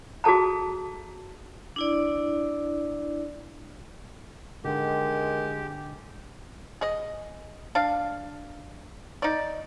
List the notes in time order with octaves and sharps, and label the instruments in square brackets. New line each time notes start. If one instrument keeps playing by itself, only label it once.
[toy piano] F#4 G#4 A4 A5 A#5
[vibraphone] D4 E4 D5
[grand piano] D3 [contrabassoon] D#3 [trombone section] G#3 [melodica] G4
[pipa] G#4 D#5
D4 F5
D#4 D5